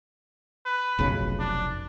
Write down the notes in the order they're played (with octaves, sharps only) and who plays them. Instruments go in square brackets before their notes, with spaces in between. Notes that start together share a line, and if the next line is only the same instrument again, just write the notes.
[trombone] B4
[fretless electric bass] F1 B1 C#3
[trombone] D4